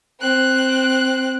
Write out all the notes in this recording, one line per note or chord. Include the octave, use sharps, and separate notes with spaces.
C4 F#6